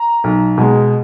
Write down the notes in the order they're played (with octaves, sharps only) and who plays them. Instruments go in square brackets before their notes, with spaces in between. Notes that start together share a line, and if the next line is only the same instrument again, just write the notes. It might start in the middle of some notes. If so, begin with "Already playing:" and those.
Already playing: [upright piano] A#5
B1
B2 G#3